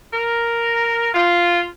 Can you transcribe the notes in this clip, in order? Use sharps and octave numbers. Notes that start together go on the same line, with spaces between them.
A#4
F4